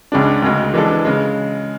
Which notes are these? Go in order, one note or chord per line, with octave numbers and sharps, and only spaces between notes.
C#2 C#3 G#3 D4
D2 C#3 G#3
E3 G#3 D4 A4
C#3 G#3